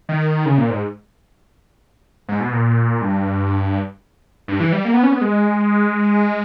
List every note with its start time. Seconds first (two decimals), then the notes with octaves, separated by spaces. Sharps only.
0.09 D#3
0.46 C#3
0.58 A#2
0.70 G#2
2.29 G#2
2.41 B2
2.53 A#2
3.01 G2
4.48 G2
4.60 E3
4.73 G3
4.85 A#3
4.93 B3
5.03 C#4
5.12 B3
5.21 G#3